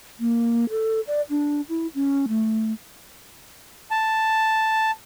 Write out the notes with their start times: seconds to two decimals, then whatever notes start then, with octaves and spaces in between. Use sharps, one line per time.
0.20 A#3
0.70 A4
1.07 D5
1.30 D4
1.69 E4
1.95 C#4
2.28 A3
3.91 A5